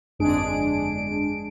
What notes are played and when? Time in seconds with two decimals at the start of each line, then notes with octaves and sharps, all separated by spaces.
0.19 G1 F2 G#3 D4 G#4 D7